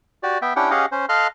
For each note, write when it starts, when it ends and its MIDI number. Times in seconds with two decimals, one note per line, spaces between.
0.23 0.38 66
0.23 0.38 67
0.23 0.38 74
0.42 0.54 59
0.42 0.54 76
0.42 0.54 79
0.56 0.71 61
0.56 0.71 62
0.56 0.71 64
0.56 0.71 67
0.56 0.71 78
0.56 0.71 79
0.71 0.86 61
0.71 0.86 67
0.71 0.86 68
0.71 0.86 75
0.71 0.86 77
0.71 0.86 78
0.92 1.06 61
0.92 1.06 72
1.09 1.27 69
1.09 1.27 75
1.09 1.27 77
1.09 1.27 84
1.09 1.27 89
1.09 1.27 90